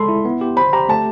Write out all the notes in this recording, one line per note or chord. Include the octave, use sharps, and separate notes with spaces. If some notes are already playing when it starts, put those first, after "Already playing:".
Already playing: G#3 A4 B5 C6
E4
B3
G4
C5 B5
G4 A#5
A3 A5